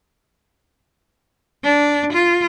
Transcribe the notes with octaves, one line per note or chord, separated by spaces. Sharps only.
D4
F4